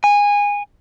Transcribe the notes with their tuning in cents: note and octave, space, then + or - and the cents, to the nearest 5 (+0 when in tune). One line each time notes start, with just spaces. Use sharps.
G#5 -20